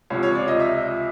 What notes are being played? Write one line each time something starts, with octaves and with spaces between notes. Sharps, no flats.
C#2 C3 F3 C#5
C#5
D5
D#5
E5